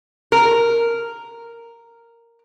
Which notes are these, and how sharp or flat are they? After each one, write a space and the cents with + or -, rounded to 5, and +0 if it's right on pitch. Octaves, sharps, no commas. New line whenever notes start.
A#4 -5